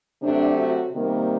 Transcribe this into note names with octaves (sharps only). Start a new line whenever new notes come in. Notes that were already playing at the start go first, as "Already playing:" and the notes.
C3 F#3 A3 D4
F#4
C3 D#3 G3 A#3